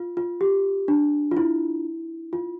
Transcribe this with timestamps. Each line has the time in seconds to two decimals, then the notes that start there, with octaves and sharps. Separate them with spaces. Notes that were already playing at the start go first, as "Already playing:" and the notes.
Already playing: F4
0.17 F4
0.41 G4
0.88 D4
1.31 F4
1.37 E4
2.33 F4